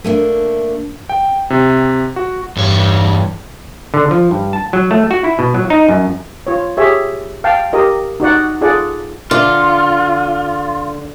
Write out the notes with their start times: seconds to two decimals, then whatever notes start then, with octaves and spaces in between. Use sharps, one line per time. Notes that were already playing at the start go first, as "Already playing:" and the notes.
0.04 A3 A#3 D4
1.09 G5
1.50 C3
2.16 F#4
2.57 E2 G2 C#5
3.94 D3
4.11 F3
4.31 G2
4.53 A5
4.73 F#3
4.91 A3
5.11 F#4
5.24 E4
5.39 B2
5.54 F#3
5.70 D#4
5.89 F#2
6.47 F4 C#5
6.77 G4 G#4 C#5 E5
7.44 F5 G5 A5
7.73 G4 A#4 D#5
8.20 D#4 F#4 D5 F#5
8.61 F4 G#4 A4 D5 F#5
9.31 D3 F4